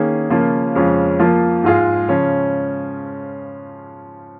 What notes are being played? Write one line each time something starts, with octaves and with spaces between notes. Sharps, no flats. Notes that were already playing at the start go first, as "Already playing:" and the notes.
Already playing: D#3 A#3 C#4 G#4
C#3 F3 A#3 C#4 F4
F2 C#3 G#3 C#4 F4
F3 A#3 F4
G#2 G#3 F4 G#4
C#3 F3 C#4